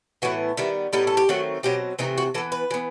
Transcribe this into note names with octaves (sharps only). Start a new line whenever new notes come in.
A2 E3 B3 F#4
D#3 G3 B3 E4
A2 G3 B3 D#4
A4
G4
D#3 F#3 A3 C4 F#4
B2 F#3 C4 G4
C3 E3 A3 C4 D#4
F#4
E3 B3 A4
B4
E3 B3